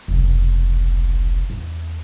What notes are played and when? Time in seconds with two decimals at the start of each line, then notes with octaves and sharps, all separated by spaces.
0.08 F1 B1
1.50 E2